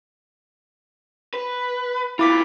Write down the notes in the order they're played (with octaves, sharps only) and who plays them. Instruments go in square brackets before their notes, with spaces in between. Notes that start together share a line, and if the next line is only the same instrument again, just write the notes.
[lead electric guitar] B4
[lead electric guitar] B2 F4 [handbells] E4 D6 B6